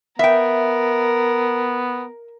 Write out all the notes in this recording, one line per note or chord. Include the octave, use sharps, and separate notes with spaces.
B3 A#4 E5 G5